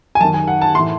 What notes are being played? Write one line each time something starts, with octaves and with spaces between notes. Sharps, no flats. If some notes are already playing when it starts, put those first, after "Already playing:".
G#5
F#2 D#3 A5
G#5
F#5
A5
A2 E3 C6